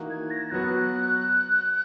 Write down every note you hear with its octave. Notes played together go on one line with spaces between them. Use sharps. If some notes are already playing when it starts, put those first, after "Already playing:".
Already playing: E3 A#3 D#4 F#4
G#6
A#6
F#3 B3 F#4 F#6